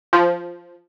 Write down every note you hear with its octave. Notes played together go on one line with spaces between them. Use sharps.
F3